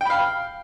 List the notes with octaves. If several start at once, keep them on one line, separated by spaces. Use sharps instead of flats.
F5 G5 B5